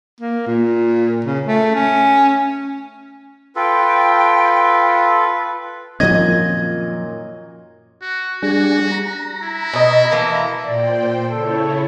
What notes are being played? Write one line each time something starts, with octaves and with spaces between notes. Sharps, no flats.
A#3
A#2
C#3
A3
C#4
F4 A4 B4 G5
F#2 A#2 D#3 F3 F#3 C4 D#5 G#6
F#4
G3 D4 F#4 G#4
A#5
E4
B2 D#5
E3 A3 A#3
A#2 C5 D5 G5
C#3 E4 A4 C#5